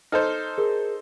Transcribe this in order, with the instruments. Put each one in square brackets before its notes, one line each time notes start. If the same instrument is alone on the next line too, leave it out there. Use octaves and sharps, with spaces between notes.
[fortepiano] D#4 A4 C5 [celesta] F6
[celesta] G#4 A#4